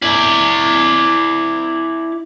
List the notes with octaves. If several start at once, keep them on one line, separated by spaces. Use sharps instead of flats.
E4 D5